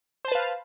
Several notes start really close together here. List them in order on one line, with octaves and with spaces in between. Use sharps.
C5 A5 B4 F5